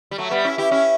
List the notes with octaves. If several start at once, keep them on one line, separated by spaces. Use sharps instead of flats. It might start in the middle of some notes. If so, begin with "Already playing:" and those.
G3
F#3 A3
G3 B3
C#4 E4
E4 G4
C#4 E4